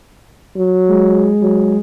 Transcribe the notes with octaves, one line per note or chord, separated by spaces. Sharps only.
F#3
G#3
F#3